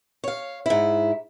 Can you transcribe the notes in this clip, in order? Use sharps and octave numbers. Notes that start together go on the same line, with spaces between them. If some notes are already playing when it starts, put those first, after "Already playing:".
C#5 F5
G#2 E4